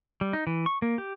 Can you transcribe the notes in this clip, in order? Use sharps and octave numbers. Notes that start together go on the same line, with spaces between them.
G3
D#4
E3
C#6
A#3
G4